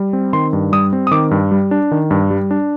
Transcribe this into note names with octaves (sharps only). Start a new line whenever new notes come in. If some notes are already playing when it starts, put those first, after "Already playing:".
Already playing: G3
C4
D#3 C6
G2
G3 D#6
C4
D#6
D#3 D6
G2
G3
D4
D#3
G2
G3
D4